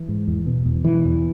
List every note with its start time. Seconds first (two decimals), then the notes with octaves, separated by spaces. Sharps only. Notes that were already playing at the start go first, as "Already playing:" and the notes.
Already playing: E3
0.08 G#2
0.28 E2
0.47 B2
0.66 E2
0.85 B2 E3
1.05 E2